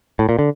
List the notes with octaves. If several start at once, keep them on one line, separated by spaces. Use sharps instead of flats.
A2
A#2
D3